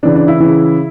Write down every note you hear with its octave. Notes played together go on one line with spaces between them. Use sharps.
C#3 E3 D4
D4
E4
C#3 E3